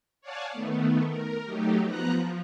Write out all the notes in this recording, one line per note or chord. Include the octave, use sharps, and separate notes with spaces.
C#5 D5 F5 F#5 G#5 A5
D#3 A3 B3
A#4
F#3 A3 D#4 G4
F3 B3 A#5 F#6
F3